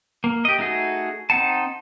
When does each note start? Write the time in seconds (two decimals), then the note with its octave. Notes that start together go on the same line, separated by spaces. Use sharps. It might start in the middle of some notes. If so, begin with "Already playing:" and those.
0.24 A#3
0.45 G4 D#5
0.59 A3 D#4 F#4 G#4
1.30 C4 D#4 F#5 A5